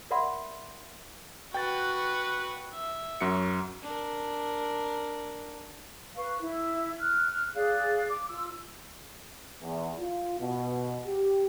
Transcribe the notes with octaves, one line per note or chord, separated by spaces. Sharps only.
A#4 D5 E5 F#5 B5 C6
F#4 B4 G5 A6
E5
F#2 F#4 C#7
D4 A#4
B4 F5 C#6
E4
F6 F#6
G#4 D5 F5 F#6
D6
F4 E6
E2
F4
B2
G4